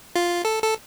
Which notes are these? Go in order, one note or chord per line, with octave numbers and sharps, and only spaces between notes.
F4
A4
A4